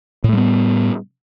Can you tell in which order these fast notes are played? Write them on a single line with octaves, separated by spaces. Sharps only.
A2 A3 G3 B3